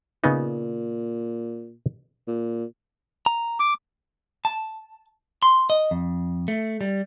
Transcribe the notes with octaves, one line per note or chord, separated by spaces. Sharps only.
A#2 C#3 B3 D#4
A#2
A#5
D6
A5
C6
D#5
F2
A3
G3